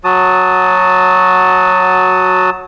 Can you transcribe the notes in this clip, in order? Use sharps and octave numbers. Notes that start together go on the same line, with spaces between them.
F#3 F#4 A5 D#6